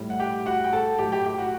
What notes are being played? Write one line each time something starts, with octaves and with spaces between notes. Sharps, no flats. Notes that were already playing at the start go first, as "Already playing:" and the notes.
Already playing: A2 G3
F#5
G4 G5
F#4 F#5
G5
A4 A5
A2 F#3 G4 G5
G4 G5
G4 G5
F#4 F#5